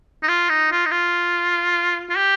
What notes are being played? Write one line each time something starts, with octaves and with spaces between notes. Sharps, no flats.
D#4
F4
D#4
F4
D#4
F4
F4
G4